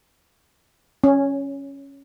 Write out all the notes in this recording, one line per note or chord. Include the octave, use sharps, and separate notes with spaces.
C#4